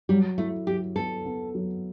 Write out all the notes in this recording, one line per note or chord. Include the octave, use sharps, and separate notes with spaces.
F#3 G3
A3 E4
F#3 G4
B3 A4
B3
F#3